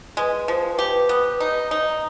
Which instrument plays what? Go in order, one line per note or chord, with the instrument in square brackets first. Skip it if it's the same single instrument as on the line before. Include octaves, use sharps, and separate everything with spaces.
[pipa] G#3 [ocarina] B4
[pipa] F3
G4
B3
D#4
D#4